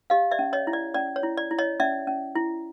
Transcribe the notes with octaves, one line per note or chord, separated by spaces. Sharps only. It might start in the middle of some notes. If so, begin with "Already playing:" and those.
G4 D#5 F5
D5 E5
C#4
C#5 D#5
E4
D5
C#4 D5
C#5
E4
D5
E4
C#5 D#5
C#4 D5 E5
C#4
E4